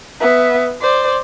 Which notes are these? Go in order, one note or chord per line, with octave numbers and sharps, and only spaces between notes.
B3 E5
C5 D5